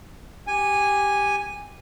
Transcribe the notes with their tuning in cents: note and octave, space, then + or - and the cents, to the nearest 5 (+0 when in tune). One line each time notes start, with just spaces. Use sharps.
G4 +0 G#5 -10